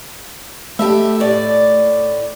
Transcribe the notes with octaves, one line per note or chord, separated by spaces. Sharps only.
A3 G4 A4 E5
A2 D5